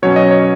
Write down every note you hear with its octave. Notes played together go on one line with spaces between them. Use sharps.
B2 F#3 C#4 C#5
D#5
C#5